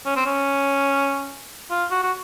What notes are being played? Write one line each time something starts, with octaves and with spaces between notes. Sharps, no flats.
C#4
C4
C#4
F4
F#4
F#4